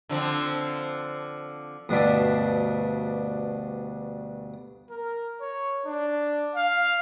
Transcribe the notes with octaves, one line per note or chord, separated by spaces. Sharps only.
D3 F3 C4
D2 G2 B2 D4 E5
A#4
C#5
D4
F5